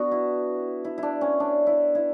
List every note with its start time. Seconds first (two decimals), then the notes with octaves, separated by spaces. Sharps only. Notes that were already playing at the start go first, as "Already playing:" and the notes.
Already playing: B3 D4 F#4
0.12 E4
0.85 E4
0.98 D4 E4
1.21 C#4
1.40 D4
1.67 E4
1.95 E4